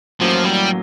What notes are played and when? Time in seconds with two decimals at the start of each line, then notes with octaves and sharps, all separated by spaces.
0.21 A1 A2 F3 F#3 A#3 C#4
0.45 G3